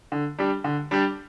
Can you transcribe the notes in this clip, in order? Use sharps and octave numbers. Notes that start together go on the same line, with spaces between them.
D3
G3 D4 G4
D3
G3 D4 G4